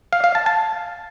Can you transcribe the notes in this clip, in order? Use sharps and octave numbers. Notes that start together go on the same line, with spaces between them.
F5
F5
A5
A5